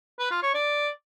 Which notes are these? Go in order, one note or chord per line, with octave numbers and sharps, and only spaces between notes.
B4
F4
C#5
D5